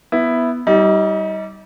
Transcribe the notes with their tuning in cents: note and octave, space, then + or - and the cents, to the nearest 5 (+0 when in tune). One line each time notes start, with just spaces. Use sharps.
B3 +0 E4 +0
G3 -15 D#4 +30